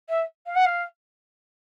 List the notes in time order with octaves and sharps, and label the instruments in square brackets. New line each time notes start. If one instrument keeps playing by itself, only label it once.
[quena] E5
F5
F#5
F5